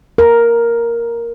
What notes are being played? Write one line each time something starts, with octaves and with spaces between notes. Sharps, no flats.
A#4